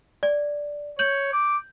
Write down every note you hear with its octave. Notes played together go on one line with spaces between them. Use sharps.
D5
C#5 G6 F#7
D6